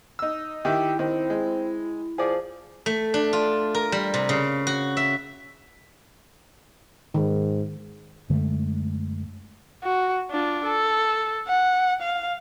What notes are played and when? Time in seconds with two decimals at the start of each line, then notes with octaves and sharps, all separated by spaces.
0.19 D#4 E6
0.65 D#3 E4 G4 E5 D6
0.99 D#3 C4
1.30 G#3
2.18 F3 G#4 D5
2.86 A3
3.14 D4
3.33 F4
3.75 A#4
3.92 G3
4.14 C3
4.29 C#3
4.67 F#4
4.97 E5
7.14 G#2 D#3
8.30 F#2 D3 G#3 A3
9.84 F#4
10.30 D4 F4
10.65 A4
11.48 F#5
12.01 F5